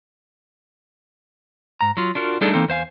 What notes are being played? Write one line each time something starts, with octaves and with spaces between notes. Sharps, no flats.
G#2 A#5
F#3 F4
D4 F4 F#4 A#4
G3 A3 D4 D#4 G#4 A4
E3 A#3 C4 D#4 A4
E2 C5 F5 G#5